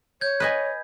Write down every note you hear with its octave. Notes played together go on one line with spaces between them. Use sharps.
C#5 G6 G#6
B4 D#5 G#5